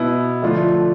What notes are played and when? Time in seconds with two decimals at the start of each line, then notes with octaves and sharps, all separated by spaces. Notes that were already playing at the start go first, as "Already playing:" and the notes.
Already playing: B2 B3 E4
0.42 D3 F3 A3 D4 F4